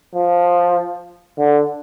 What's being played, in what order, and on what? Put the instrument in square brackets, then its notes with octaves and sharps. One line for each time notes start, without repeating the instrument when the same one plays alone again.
[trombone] F3
D3